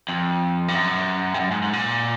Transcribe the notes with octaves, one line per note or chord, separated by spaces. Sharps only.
F2
G2
F#2
G2
F#2
G#2
G#2
A#2